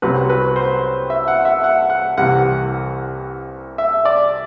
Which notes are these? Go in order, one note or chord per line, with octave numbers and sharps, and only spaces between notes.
C2 C3 F#3 C4 B4
B4
C5
E5
F#5
E5
F#5
F#5
C2 C3 E3 F#5
E5
D5